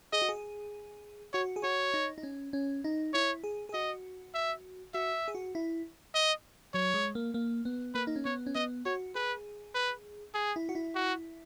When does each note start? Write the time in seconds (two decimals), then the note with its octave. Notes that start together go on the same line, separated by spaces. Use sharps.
0.13 G#4 D#5
0.22 F#4
0.29 G#4
1.33 F#4 C#5
1.56 G#4
1.63 F#4 C#5
1.94 D#4
2.18 D#4
2.23 C#4
2.53 C#4
2.84 D#4
3.14 E4 C#5
3.44 G#4
3.69 G#4
3.74 F#4 D#5
4.35 E5
4.94 F#4 E5
5.28 G#4
5.35 F#4
5.55 E4
6.15 D#5
6.74 F#3 C#5
6.94 G#3
7.15 A#3
7.34 A#3
7.65 B3
7.94 A#3 B4
8.07 D#4
8.16 C#4
8.25 B3 C#5
8.46 C#4
8.55 B3 D#5
8.85 F#4 C#5
9.15 G#4 B4
9.75 B4
10.35 G#4
10.56 E4
10.69 F#4
10.75 E4
10.95 F#4